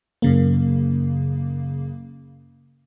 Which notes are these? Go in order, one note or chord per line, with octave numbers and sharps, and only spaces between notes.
F#2 C#3 A#3